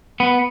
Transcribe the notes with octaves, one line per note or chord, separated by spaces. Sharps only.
B3